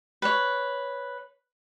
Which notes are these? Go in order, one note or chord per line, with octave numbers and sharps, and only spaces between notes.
B4 C#5